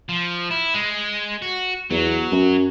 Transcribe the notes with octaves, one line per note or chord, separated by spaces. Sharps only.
F3
E4
G#3
F#4
E2 F#3
F#2